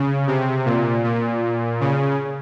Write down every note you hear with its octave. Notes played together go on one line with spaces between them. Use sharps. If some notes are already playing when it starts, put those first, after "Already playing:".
Already playing: C#3
C3
A#2
A#2
C#3